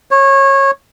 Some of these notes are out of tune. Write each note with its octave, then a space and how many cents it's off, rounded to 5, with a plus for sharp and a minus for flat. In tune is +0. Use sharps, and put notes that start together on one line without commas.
C#5 -20